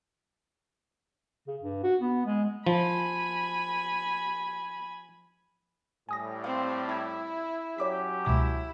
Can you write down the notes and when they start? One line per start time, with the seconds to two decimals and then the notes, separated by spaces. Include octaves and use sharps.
1.47 C#3
1.62 G2
1.83 F#4
2.01 B3
2.26 G#3
2.67 F3 G#5 B5
6.09 A2 G3 G#5 D#6 A#6
6.44 C4 F5
6.89 E4 A5 G#6
7.78 F#3 C#4 G4 C#5 D6 B6
8.25 C#2 B2 E4 D6